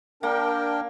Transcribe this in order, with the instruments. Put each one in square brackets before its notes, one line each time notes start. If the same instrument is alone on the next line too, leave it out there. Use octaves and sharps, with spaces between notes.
[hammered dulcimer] A#3 [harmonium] D4 A#4 G5